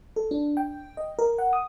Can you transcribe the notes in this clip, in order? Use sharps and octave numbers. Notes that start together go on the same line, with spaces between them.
A4
D4
G5
D#5
A#4
F#5
D#6